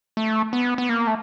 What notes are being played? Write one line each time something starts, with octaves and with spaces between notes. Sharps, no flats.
A3
B3
B3
A#3
A3